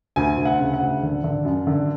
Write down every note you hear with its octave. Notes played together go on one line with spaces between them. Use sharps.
D2 G#5
D2
F#5
C#3
F#5
D2
D3
D3
F#2
D3